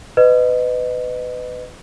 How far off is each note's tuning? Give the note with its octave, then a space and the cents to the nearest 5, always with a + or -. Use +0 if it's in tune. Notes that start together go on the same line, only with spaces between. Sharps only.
B4 +25 D#5 -15